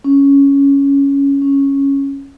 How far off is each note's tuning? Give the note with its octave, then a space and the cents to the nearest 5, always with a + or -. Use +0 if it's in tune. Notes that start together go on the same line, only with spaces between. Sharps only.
C#4 +5
C#4 -5